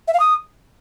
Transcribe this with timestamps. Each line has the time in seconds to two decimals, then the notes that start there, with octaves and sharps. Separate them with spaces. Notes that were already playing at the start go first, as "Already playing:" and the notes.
0.08 E5
0.14 F5
0.20 D#6